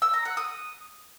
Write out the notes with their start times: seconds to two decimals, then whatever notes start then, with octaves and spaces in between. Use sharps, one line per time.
0.02 E6
0.14 A#5
0.25 F#5
0.37 D#6